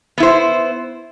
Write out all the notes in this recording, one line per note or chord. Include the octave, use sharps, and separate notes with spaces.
B3 E4 C5